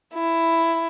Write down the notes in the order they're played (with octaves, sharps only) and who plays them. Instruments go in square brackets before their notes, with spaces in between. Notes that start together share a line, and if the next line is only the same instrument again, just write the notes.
[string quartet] E4